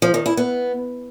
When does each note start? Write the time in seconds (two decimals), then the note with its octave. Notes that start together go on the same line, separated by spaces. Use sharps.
0.02 F3
0.14 D#3
0.26 E4
0.37 B3